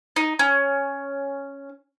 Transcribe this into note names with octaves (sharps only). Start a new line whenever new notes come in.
D#4
C#4